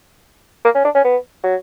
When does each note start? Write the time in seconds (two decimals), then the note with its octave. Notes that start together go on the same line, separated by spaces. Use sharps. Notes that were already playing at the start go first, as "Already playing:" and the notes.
0.65 A#3
0.75 C#4
0.85 D4
0.95 C#4
1.05 B3
1.44 F#3